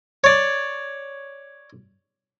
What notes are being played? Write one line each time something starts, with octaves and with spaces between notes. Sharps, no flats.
C#5 D5